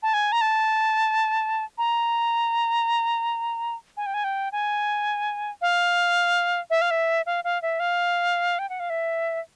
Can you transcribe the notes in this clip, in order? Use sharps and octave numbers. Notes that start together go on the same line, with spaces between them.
A5
G#5
A#5
A5
A#5
G#5
G5
G#5
G5
G#5
F5
E5
F5
E5
F5
F5
E5
F5
G5
F#5
F5
E5